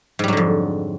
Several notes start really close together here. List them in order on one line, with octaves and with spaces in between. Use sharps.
G#2 G3 F#3 D3 F2